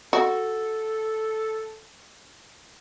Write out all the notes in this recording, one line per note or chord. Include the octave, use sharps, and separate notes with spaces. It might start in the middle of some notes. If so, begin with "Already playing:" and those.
F#4 A4